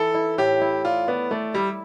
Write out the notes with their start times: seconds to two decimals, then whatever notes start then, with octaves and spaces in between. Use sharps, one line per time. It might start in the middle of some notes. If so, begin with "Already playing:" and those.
Already playing: E3 A4
0.14 E4
0.38 A2 G4
0.61 E4
0.85 F4 D5
1.08 B3 D5
1.31 A3 D5
1.54 G3 E4